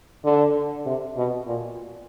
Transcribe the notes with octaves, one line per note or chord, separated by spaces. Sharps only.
D3
C3
B2
A#2